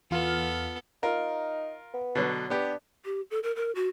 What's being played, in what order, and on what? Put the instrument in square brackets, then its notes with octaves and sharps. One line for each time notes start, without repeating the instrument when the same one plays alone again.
[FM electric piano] E2 F4 F6 [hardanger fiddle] B3 A4
[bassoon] D#4 [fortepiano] F4 A#4
[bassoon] B3
[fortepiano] B2 D3 F#3
[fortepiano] B3 G4 [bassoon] D4
[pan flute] G4
A4
A#4
A#4
F#4